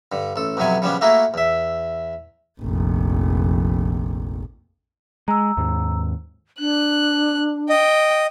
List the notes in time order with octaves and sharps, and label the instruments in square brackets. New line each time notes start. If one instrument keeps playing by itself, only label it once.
[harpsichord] G2 D3
A1 A4
B1 F2 C3 F#3 B3 G#5
C#3 F3 G3 B3 C#4 D4
A3 A#3 E4 F#4 G#4 A#4
E2 E5
[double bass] F1 A#1
[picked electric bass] G#3 [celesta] A#5 E6
[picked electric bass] D#2 G#2
[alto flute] D4 [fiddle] F#6
[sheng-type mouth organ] D#5 [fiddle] G5